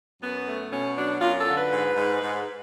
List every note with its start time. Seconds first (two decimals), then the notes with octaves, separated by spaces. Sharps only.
0.21 F#2 B3
0.46 A3
0.71 B2 C#4
0.96 F#3 D4
1.21 F#2 F4
1.38 A4
1.47 D3
1.55 B4
1.72 G#2
1.96 G#2
2.22 G#2